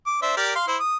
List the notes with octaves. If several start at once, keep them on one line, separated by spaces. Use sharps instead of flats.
D6
D4 C5 E5
G4 A#4 D5
F5 C6
E4 C5
D#6